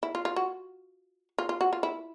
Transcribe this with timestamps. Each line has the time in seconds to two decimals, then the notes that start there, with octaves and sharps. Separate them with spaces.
0.03 E4
0.15 F4
0.25 F4
0.36 F#4
1.38 F4
1.49 F4
1.61 F#4
1.73 F4
1.83 E4